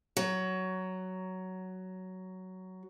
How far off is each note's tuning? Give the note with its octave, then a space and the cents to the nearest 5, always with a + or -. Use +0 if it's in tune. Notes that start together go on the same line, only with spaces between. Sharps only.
F#3 +10